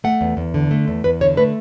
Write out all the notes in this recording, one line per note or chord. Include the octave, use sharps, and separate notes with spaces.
A3 F#5
E2
E2
D3
A3
E2
E2 B4
D3 C#5
A3 B4